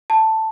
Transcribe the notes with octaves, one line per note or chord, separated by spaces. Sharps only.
A5